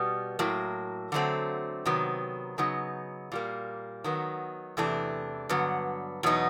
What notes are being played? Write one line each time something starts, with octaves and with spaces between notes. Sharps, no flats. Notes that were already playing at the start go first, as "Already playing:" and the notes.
Already playing: B2 G3 B3
A2 F#3 A#3
D3 F#3 A3 C4
C3 D#3 F#3 B3
C#3 F#3 B3 D#4
A#2 G3 A#3
D#3 F#3 B3
E2 C3 E3 A3 D4
G2 D3 F#3 B3
E2 B2 F#3 B3 D#4